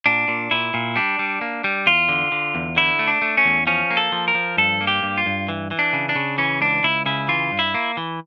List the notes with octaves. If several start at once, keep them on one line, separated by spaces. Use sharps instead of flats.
A#2 D4
A#2
A#2 E4
A#2
G3 D4
G3
A#3
G3
E2 F4
D3
D3
E2
D3 E4
A3
D4
A3
C#4
E2
F3 C#4
A#3
A4
F3
A#4
F3
G2 A4
A#3
G4
G2
F4
G2
E3
E3
D4
C#3
D4
C#3
E3 C#4
C#2 D4
C#2 E4
C#3 E4
E3 F4
G2
E4
A#3
E3